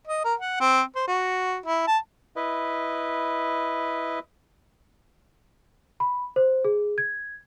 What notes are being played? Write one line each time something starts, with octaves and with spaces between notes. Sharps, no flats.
D#5
A#4
F#5
C4
C5
F#4
E4
A5
E4 B4 D#5
B5
C5
G#4
G#6